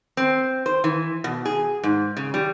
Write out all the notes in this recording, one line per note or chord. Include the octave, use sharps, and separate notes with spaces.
C4
C5
E3
B2
G#4
G#2
C#3
G3